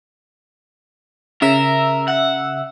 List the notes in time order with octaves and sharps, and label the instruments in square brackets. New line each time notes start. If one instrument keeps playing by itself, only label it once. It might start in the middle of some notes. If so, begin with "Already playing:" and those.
[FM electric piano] C#3 E5 E6 [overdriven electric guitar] A#4
[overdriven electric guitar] F#5